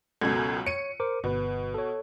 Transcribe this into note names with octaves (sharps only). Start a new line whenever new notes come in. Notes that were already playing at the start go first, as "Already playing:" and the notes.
C#2 F#2 B2 A4 G#6
C#5 C#7 D#7
A#4 C5 D6
G1 B2 B4
A4 C#5